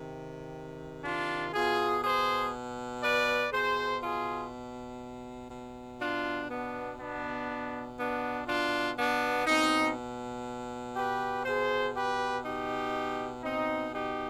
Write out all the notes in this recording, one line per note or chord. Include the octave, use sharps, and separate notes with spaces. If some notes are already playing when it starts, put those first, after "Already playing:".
Already playing: C3 D#3
D4 F4
B2 F4 G#4
G#4 C5
B4 D5
B2 G#4 C5
F4 G#4
B2
D4 F4
B3 D4
B3 D4
B2
B3 D4
D4 F4
B3 D4
B2 C4 D#4
G4 B4
B2 G#4 C5
G4 B4
D#4 G4
B2 C4 D#4
D#4 G4